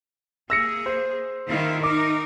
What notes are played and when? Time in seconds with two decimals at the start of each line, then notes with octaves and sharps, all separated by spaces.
0.50 A#3 G#4 E6 A#6 C#7
0.86 C5
1.47 D#3 E4 F4
1.83 D#4 A#4 D6